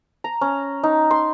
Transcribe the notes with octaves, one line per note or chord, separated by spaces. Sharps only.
A#5
C#4
D#4
C6